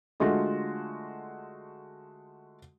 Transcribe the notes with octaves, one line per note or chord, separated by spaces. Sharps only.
D3 G#3 A3 F4 F#4